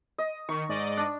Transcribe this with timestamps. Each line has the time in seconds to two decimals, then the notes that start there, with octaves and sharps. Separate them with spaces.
0.18 D#5
0.49 D#3 C#6
0.69 G#2 D5 D#5
0.97 D4